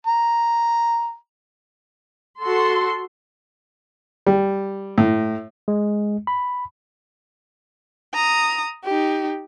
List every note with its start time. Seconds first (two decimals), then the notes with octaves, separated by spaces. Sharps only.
0.07 A#5
2.41 F#4 A4 C6
4.27 G3
4.98 A2
5.68 G#3
6.27 B5
8.14 A#5 D#6
8.84 D#4 G4